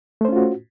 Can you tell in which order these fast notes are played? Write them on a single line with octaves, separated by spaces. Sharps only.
A3 C5 C#4 F4 F#4